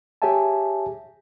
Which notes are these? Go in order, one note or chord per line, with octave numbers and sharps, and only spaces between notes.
G4 G#4 C#5 E5 G#5 A5